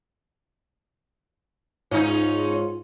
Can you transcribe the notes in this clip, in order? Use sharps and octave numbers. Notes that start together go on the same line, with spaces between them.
G#2 C#4 D#4 F4